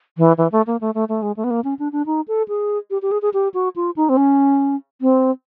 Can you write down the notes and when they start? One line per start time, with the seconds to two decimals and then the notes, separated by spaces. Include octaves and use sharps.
0.18 E3
0.38 E3
0.52 A3
0.67 A#3
0.81 A3
0.95 A3
1.09 A3
1.22 G#3
1.37 A3
1.44 B3
1.51 A#3
1.64 C#4
1.79 D4
1.92 D4
2.06 D#4
2.28 A4
2.48 G#4
2.91 G4
3.02 G4
3.12 G#4
3.22 G#4
3.34 G4
3.54 F#4
3.76 F4
3.96 D#4
4.09 C4
4.17 C#4
5.02 C4